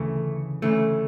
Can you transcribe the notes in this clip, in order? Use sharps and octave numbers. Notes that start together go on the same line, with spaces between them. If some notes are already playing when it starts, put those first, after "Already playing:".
Already playing: D2 C#3 E3 A3
D2 C#3 E3 A3